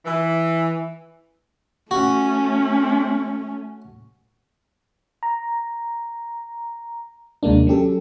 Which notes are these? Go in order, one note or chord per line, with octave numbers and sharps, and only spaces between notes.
E3
A3 C#4 F#4
A#5
D#2 C3 G#3 A#3 D4
F#3 C#4 G4 A4